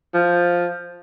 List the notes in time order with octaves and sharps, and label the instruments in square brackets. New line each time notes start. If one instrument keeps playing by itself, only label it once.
[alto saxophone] F3